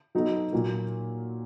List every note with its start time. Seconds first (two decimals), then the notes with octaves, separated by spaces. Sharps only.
0.15 F#3 B3 D#4 F#4 A4
0.53 A#2 F#3 A#3